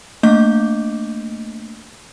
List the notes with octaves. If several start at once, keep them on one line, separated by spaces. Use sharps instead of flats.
A3 A#3 D4 D#5 D6 G6